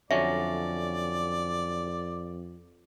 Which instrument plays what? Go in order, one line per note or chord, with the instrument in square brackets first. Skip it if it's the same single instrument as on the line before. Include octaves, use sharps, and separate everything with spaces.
[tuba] F2 [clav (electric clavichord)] D3 F#3 C#4 [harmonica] D5 [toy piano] E5